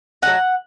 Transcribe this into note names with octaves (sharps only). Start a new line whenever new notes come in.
F#3 A3 D#4 F#5